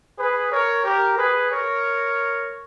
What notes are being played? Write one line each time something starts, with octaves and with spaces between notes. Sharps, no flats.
G#4 B4
A#4 C#5
G4 A#4
G#4 B4
A#4 C#5